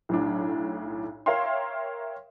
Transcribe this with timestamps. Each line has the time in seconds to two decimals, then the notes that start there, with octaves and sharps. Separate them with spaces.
0.09 B1 A2 D4
1.26 A#4 C#5 E5 F5 G5 C6